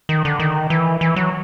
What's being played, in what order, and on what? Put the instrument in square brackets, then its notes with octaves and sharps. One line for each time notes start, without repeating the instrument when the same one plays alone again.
[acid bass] D#3
D3
D#3
E3
E3
F#3